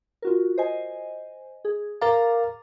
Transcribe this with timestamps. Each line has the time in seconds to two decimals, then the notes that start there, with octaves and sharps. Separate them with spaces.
0.22 F4 F#4 A#4
0.58 C5 D#5 G#5
1.65 G#4
2.02 A#4 F5 A#5 D6 A6